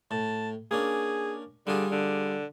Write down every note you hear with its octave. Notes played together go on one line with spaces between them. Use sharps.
A2 A5
A#3 C#4 D4 G#4
D3 G3 F4 G#4
D3